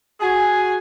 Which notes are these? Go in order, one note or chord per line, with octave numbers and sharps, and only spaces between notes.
F#4 G#4 G#5